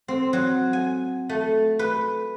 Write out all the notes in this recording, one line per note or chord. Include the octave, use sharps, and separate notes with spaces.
C4
F#3
G#5
A3
B4